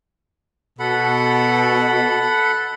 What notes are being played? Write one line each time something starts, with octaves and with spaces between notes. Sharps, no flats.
B2 A4 F#5 B5